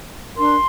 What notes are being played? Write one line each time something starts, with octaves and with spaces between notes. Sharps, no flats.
D4 A#4 C6